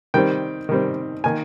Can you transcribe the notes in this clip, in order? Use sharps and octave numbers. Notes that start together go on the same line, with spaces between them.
D#3 G3 C4 G5
D#3 G3 C4
D#3 A#3 G#5